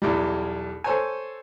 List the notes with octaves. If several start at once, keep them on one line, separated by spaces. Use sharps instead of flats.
B1 E2 G3
A4 C5 C#5 G#5